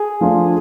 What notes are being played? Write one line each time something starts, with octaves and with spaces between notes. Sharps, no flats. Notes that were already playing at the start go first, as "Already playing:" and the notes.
Already playing: G#4
F3 A3 D4 F4